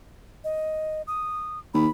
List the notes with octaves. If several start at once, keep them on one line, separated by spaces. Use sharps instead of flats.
D#5
D#6
D#2 B5